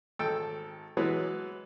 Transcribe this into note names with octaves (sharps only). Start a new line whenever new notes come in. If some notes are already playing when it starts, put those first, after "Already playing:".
G#1 A4 G5 E6
E3 F#3 G#3 B3